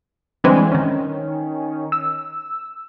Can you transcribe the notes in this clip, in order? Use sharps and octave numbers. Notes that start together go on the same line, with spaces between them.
D3 E3 G3 G#3 C4 C5
D#3 C#4
E6